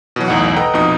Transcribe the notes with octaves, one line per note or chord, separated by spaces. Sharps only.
B2 E3 F#3
B1 E2 A2 D#4 F#5
A4 B4 D#5 F#5 G5 A#5
A#1 F2 B2 D#4 D#6